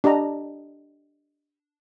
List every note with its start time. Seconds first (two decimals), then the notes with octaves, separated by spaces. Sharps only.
0.04 D4 G4 D#5 A#5